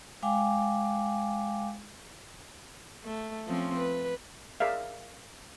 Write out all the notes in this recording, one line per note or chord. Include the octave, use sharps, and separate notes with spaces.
G#3 F5 G5 G#5 D6
A3
F3 C4 C#4
B4
G#4 A#4 D5 E5 F5